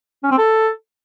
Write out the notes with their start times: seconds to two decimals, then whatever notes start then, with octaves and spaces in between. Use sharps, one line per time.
0.23 C#4
0.31 C4
0.38 A4